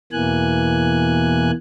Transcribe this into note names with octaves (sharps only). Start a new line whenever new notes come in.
E2 B2 E3 A#3 G#5 F#6